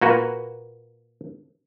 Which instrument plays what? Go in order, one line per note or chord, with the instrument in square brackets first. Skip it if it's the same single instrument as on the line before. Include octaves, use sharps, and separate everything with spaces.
[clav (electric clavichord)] A#2 A#3 F#4 B4